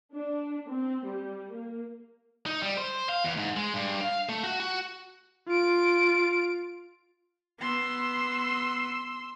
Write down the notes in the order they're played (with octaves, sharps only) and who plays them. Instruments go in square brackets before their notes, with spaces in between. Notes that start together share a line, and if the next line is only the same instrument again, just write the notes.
[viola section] D4
C4
G3
A#3
[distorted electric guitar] D#4
G3
C5
F5
E2
G#2
G#3
G2
F5
A3
F#4
F#4
[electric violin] F4 D7
[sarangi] B3 [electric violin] C6 E6